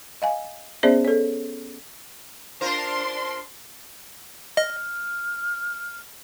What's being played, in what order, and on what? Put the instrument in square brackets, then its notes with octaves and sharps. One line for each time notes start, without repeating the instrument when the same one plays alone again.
[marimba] D#5 F5 G#5
B3 C#4 G#4 C5 D5 E5
A4 C#5
[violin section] D4 C6 [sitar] F4 A#4 C5
[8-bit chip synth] D#5 [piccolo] F6